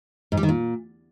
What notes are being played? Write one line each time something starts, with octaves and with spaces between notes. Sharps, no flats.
G#2
G3
D#3
A#2